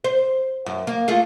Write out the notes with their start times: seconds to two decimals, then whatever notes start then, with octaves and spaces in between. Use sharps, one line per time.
0.04 C5
0.66 F#2
0.87 A#3
1.08 A3 F4 G#4